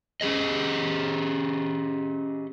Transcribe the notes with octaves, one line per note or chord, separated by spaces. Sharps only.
C#4 G4 G#4 D#5